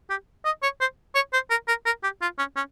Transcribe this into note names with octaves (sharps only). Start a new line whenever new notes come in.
G4
D#5
C#5
C5
C#5
C5
A#4
A#4
A#4
G4
F4
C#4
C#4